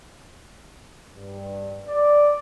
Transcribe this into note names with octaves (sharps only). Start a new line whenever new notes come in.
G2
D5